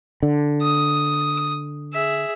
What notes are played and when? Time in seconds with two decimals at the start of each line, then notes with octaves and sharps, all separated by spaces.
0.23 D3
0.62 D#6
1.93 G#4 E5